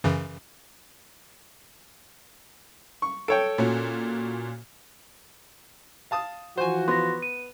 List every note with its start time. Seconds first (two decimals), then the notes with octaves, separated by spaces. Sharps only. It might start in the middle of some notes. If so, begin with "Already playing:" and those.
0.04 F#2 C#3 E3
3.02 C#6
3.28 A4 C#5 G5 D7
3.58 A#2 C#4 F#4
6.11 F5 A5 D#6
6.57 E3 F3 F#4 C5 G#5
6.88 B3 C6 A#6
7.22 D#7